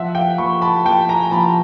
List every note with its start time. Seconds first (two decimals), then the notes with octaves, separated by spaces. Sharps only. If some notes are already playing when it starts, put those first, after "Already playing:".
Already playing: F3 E5 F#5
0.15 F5 G5
0.38 F3 B5 C#6
0.62 A5 B5
0.85 F3 G5 A5
1.09 G#5 A#5
1.31 F3 A5 B5